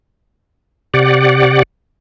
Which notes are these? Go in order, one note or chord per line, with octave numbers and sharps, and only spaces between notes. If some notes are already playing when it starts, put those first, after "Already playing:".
C3 G4 D5 F#5